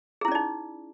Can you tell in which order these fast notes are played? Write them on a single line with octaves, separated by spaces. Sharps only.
G#4 E4 C#4 D5 D#4